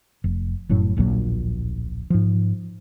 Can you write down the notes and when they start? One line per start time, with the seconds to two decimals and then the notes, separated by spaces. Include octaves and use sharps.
0.24 F1
0.69 F1 F#2 A2 F#3
0.97 D1 A#1 A#2 F#3
2.10 G#2 F3